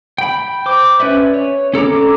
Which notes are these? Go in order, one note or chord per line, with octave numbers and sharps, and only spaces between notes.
G5 B5
C5 D6
C#4 B4 D5 E5
C#5
C#4 A4 A#5 D6